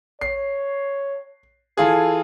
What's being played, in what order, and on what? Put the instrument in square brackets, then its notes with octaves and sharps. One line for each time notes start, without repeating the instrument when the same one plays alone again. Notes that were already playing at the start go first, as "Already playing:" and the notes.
[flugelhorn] C#5 [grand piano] C7
[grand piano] E3 F4 G#4 [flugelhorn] A4